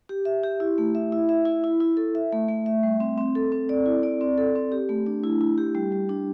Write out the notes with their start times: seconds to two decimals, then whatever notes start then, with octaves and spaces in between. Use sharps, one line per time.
0.09 G4
0.25 E5
0.43 G4
0.60 E4
0.78 A3
0.95 E5
1.12 E4
1.29 E5
1.45 E4
1.64 E4
1.80 E4
1.97 A4
2.15 E5
2.32 A3
2.48 A3
2.66 E5
2.83 G3
3.00 C4
3.18 C4
3.35 A4
3.52 C4
3.69 D5
3.86 E4
4.03 D5
4.21 C4
4.38 A4
4.55 C4
4.72 G4
4.89 A3
5.06 D4
5.24 E4
5.41 E4
5.58 G4
5.75 G3
5.92 G3
6.09 D4